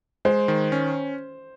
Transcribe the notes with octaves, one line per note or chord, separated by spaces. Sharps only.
G#3 C5
D#3
C#4